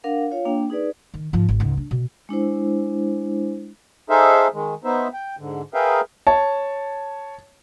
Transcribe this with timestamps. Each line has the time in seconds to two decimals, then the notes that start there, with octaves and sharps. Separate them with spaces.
0.04 D4 A#4 F5 F#5
0.31 F4 C#5 F5
0.45 A#3 D4 G5
0.70 D#4 G#4 B4 D5
1.14 D#3
1.33 G#2 F3
1.49 G#1
1.60 C#2 G#2
1.77 D4
1.91 B2
2.29 G#3 D4 E4 C5
4.10 D#4 G#4 A4 C5 E5 F5
4.54 D#3 G#3
4.84 B3 D#4 C5 E5
5.13 G5
5.39 G#2 D3
5.74 G#4 A#4 B4 E5 F5 G5
6.27 C#5 A5